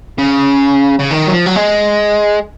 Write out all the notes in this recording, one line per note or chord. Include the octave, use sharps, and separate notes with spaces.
C#3
C#3
D#3
F#3
F3
F#3
G#3